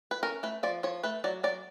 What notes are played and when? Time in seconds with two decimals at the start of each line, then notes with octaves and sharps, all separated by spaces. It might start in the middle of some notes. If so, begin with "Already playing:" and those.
0.11 B4
0.23 C#4 A#4
0.43 A3 B4
0.63 F3 D5
0.83 F3 C#5
1.03 A3 B4
1.24 F#3 D5
1.43 F#3 D5